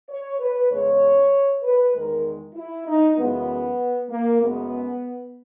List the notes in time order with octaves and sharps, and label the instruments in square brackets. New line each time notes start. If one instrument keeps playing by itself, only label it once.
[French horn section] C#5
B4
E2 C#3 G#3 C#5
B4
E2 D#3 G#3 A#4
E4
D#4
F#2 C#3 E3 G#3 B3
A#3
F#2 C#3 G#3 B3